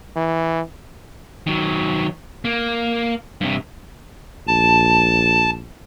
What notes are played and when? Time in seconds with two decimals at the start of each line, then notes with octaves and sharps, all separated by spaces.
0.16 E3
1.47 D#3 F#3
2.45 A#3
3.41 G2 C3
4.47 A#1 A5